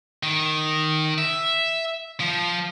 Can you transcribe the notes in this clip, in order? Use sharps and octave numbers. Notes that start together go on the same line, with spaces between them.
D#3
E5
F3